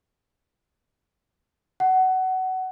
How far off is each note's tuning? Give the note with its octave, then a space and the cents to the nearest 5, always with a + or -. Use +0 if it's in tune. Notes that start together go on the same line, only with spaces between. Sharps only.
F#5 +20